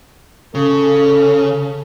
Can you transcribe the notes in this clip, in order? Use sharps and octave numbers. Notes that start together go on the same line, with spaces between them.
C#3 A4